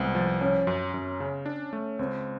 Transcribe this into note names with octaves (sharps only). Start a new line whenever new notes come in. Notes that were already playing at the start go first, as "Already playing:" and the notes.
Already playing: C2 G#3 B3 C4
F3
F3 C#4
F#2
F#2
C#3
D4
A3
C#2 C4